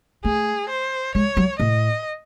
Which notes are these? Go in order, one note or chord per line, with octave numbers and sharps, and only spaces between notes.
A3 G#4
C5
G#3 C#5
F#3
A2 D#5